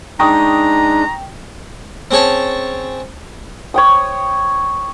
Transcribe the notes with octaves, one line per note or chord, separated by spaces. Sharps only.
G#3 D4 D#4 G5 A#5 C#6 D#6
C4 C#4 G#4 C#5 A5
C#5 G5 D#6